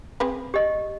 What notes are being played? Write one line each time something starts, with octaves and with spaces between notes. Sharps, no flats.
C4 G#4 B4
G4 D#5